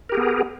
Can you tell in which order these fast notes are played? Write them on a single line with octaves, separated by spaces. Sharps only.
A#4 G4 G#4 B3